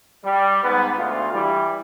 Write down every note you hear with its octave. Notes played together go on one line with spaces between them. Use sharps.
G3
G#2 B3
D2 F4
E3 G3